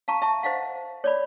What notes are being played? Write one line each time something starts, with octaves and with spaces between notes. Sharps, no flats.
F5 A5 A#5 C#6
E5 A5 C#6
C5 D#5 F5 F#5
C#5 D5 B5